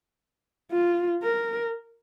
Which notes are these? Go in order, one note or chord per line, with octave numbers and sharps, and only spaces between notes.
F4
A#4